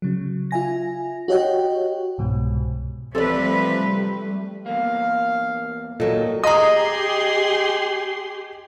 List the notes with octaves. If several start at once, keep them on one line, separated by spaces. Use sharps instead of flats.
C#3 F#3
F4 E5 G#5 A#6
F#4 G4 C#5 D#5 F#5 G5
C2 G#2 B2
C3 F3 G3 A3 A4 B4 D5
E2 A#3 F5
A#2 D#3 F#3 A4 D#5
G4 G#4 D#5 A#5 C6 D#6